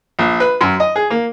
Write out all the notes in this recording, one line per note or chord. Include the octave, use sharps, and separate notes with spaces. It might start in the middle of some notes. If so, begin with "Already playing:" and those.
A#1
B4
F#2
D#5
G#4
A#3